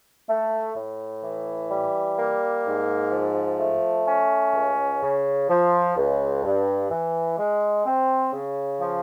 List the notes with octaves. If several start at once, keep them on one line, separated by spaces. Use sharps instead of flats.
A3
A2
E3
G3
A#3
G#2
F3
A3
C#4
C#2
C#3
F3
C#2
G2
E3
G#3
C4
C#3
F3